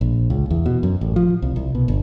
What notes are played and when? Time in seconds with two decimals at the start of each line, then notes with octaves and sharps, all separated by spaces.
0.01 A#1
0.30 C#2
0.51 E2
0.66 B2
0.83 F#2
1.01 A1
1.16 F3
1.42 C2
1.56 C2
1.75 B2
1.88 G1